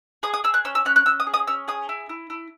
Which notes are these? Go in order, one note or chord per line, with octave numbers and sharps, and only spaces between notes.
G#4 D#6
D#6
G#4 E6
F#6
C#4 E6
E6
C#4 F#6
F#6
C#4 E6
D#6
G#4
D#6
C#4 E6
G#4 D#6
E4
E4
E4